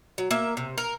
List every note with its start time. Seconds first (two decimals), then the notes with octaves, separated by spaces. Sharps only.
0.18 F#3
0.31 A#3 E5
0.57 C3
0.78 A#4